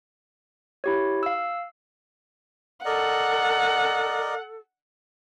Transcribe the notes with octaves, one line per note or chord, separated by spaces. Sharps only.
E4 G4 C#5
F5 E6
A4 A#4 D5 D#5 F#5